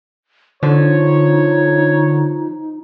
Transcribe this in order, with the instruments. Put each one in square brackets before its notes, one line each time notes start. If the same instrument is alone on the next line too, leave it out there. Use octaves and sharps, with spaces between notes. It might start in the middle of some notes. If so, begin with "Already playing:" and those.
[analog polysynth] D3 [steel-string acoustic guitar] F3 [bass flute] D#4 [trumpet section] C#5